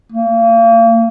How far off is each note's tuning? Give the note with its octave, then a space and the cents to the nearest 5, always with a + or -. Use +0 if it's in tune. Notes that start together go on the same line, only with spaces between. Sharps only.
A#3 -35